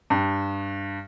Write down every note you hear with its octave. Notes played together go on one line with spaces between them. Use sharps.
G2